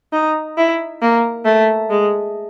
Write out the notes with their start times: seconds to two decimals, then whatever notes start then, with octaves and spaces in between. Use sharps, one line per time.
0.13 D#4
0.58 E4
1.02 A#3
1.46 A3
1.90 G#3